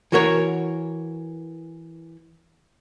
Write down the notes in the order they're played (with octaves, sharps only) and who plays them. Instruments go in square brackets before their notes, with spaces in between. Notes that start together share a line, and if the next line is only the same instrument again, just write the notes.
[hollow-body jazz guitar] E3 F#4 A#4 C#5